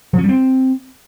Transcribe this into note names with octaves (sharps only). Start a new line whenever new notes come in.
F3
C#4
G3
C4